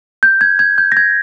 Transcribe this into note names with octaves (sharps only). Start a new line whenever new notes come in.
G6
G#6
G#6
G6
A#6
G#6